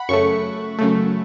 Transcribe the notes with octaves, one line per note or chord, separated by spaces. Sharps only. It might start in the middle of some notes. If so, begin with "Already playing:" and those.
Already playing: F#5 B5
F#2 C#3 A3 C#6
F#2 C#3 A3